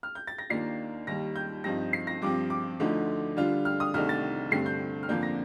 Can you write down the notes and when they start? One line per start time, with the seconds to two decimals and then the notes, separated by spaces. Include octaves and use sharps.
0.03 F6
0.15 G6
0.27 A6
0.38 A#6
0.50 D#2 D#3 A#3 D4 F4 C7
1.07 D#2 D#3 G3 A#6
1.36 G6
1.64 G2 F3 C4 D#4 A#6
1.93 C7
2.07 A#6
2.22 G2 F3 C4 D6
2.50 D6
2.80 D2 D3 F3 A3 D#4
3.37 D3 G3 D4 F4
3.65 F6
3.80 D#6
3.94 C2 C3 D#3 A3 D4 F6
4.09 A6
4.51 G2 D3 A3 C4 C7
4.66 G6
5.03 F6
5.09 F2 D3 F3 A#3 D4 G6
5.23 A#6